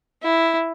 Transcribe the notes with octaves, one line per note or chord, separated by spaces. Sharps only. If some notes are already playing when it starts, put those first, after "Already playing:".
E4